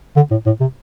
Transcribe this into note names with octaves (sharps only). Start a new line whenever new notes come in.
D3
A2
A2
C3